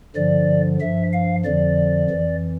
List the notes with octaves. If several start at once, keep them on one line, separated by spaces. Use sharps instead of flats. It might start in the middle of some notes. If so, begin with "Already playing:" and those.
G2 D3 F3 D5
G2 F3 E5
F5
F2 D3 F3 D5
F2 E3